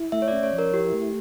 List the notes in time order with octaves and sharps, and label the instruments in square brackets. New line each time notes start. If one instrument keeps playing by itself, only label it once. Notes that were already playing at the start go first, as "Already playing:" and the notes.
Already playing: [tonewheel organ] E4
[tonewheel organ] A3 [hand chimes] E5
[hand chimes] C#5
[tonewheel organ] C#4 [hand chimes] D5
[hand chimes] C#5
[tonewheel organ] F3
[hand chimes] A#4
[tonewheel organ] E4 [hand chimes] G4
[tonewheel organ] A3